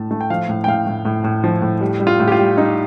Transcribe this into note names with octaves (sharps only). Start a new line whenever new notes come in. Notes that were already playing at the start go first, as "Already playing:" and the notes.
Already playing: A2 A3 A5
A3
G5
F3 F5
A2
G5
A2 F5
A2
A2
A2
F3
A2
G3
G3
F4
A2
G4
F4
G3
G3 D#4